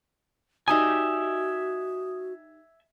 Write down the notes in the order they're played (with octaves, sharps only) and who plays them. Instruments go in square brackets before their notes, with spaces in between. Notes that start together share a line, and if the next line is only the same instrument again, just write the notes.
[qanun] D#4 G4 D5 [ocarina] F#4 [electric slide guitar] E5 G#5 [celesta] D#6